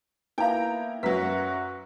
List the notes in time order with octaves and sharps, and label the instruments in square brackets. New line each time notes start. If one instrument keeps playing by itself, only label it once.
[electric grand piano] A#3 B3 E4 [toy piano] D#4 F5 [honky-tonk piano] G5 A#5
[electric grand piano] F#2 E5 A#5 [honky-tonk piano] F#3 B6 [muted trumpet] F#4 [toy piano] B4 F#5